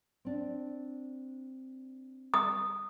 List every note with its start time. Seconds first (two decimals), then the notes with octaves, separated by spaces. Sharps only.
0.25 C4 D4
2.34 D#6